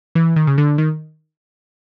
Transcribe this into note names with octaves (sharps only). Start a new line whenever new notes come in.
E3
D#3
C#3
D3
D#3